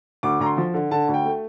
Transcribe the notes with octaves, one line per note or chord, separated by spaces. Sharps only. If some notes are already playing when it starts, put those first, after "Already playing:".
D2 D6
D2 A#5
C6
F3
D3
D3 A5
D2
G5
A3